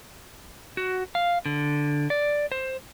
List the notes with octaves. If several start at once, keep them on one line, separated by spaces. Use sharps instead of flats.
F#4
F5
D3
D5
C5